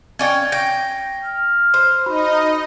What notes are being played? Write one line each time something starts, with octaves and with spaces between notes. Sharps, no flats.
C#4 D5 G5 G#6 C#7
G5 A#6
F6
C5 C6
D#4 F#4 D#5 B5